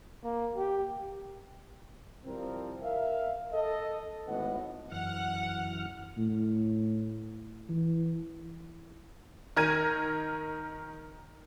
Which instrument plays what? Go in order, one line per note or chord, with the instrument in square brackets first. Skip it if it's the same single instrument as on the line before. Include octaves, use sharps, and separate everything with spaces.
[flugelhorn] A#3
G4
[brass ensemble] C3 F3 G3 C4 E4 A#4
A#4 E5 F5
A4 D#5
G#1 A2 B3 B4 D#5 F#5
[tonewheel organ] F#2 E3 F6 [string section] F#5
[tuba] A2
E3
[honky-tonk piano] D#3 A#4 G#6 D#7